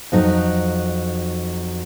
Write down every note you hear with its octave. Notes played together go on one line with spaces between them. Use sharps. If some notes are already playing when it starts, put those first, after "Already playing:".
F2 F#3 D#4